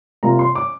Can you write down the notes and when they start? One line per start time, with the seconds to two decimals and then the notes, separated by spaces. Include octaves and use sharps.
0.23 C3 G3 A#3 F4 A#5
0.39 C6
0.55 D6